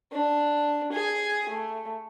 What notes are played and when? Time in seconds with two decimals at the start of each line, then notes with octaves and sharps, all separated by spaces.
0.12 D4
0.92 G#4 G#5
1.49 A3